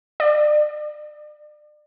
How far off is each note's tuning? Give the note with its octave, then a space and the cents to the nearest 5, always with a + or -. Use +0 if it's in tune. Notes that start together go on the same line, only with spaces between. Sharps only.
D5 +35